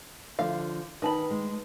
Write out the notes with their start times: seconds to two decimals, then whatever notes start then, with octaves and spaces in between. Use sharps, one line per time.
0.39 D3 F3 F5
1.02 D#3 B4 A5 B5
1.31 G#3